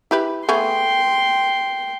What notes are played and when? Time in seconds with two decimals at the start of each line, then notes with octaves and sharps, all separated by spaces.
0.11 E4 G4 B4
0.49 A3 B3 G#4 G5 C6